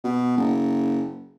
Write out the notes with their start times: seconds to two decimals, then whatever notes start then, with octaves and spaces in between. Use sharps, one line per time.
0.04 B2
0.37 F#1